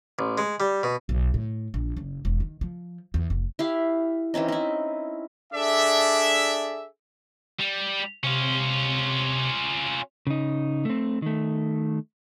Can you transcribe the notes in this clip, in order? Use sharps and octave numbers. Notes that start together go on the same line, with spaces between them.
A1
G#3
G3
B2
B1
A2
A#1
F#1
E1
D#3
F3
E2
F1
E4 G4 F5
E3 C4 C#4 D#4
D#4 E4
D4 G#4 A4 D5 E5
G3
C3 C#4 F4
C#3 D#4
A3 C4
D#3 A3